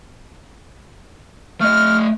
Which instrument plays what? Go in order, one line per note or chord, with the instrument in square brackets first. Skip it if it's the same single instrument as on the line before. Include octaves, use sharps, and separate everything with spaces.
[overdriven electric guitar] A3 D#5 [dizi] F6